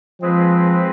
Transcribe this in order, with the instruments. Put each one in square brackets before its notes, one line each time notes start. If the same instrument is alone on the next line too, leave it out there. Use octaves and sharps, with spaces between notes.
[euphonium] F3 [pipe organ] G#3 C4 G#4 B4